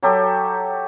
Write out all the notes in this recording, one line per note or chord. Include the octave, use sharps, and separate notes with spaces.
F#3 G4 A4